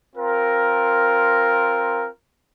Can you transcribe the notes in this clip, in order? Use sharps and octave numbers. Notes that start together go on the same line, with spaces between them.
C4 F4 A#4